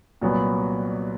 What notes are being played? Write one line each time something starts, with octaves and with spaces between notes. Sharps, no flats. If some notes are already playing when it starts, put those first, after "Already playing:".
C2 A#2 F#3 B3